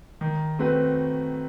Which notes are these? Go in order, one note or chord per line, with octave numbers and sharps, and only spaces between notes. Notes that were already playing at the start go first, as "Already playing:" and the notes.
D#3
A3 C4 F#4 B4